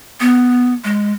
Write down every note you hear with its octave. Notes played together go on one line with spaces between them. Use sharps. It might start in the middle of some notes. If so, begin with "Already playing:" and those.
B3
G#3